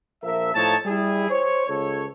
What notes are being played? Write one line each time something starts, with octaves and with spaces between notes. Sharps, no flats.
A#1 F3 A#4 E5
A2 F3 A3 D#4 C#5 A5
G3 E4 G#4
C5 C#5
C#2 A4 C#5